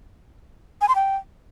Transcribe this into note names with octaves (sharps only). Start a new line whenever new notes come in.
G#5
C6
G5